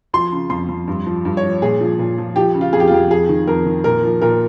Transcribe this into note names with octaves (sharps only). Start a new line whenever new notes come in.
F3 C6
C#3
F2 C6
F2
G2
F3
G2
C#5
F3
A#2 G#4
F3
A#2
F3
F3 G4
C#3
F4
F2 G#4
G4
F4
F2 G4
F2 G#4
D#3
F2 A#4
D#3
A#2 A#4
F3
A#2 A#4